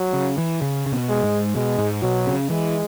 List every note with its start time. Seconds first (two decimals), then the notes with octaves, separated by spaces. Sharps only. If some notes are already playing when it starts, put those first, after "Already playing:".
Already playing: F#3
0.13 C#3
0.38 E3
0.62 C#3
0.86 C#3
0.92 B2
1.09 G#3
1.24 G#2
1.55 B2 G#3
1.79 G#2
2.02 B2 F#3
2.27 C#3
2.49 E3 G#3